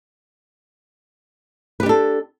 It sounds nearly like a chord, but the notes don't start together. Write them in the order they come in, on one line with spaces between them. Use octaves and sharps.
B4 G4 D4 A4